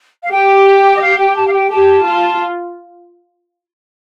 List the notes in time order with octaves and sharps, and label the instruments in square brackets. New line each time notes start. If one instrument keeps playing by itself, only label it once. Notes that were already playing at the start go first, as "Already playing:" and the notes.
[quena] F5
[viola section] G4 [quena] G5
[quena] D#5
F5
G5
A5
F5
G5
[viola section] G4 [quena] A5
[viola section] F4